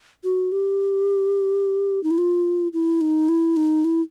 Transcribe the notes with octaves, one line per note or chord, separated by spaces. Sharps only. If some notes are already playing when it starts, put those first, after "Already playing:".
F#4
G4
D#4
E4
F4
E4
D#4
E4
D#4
E4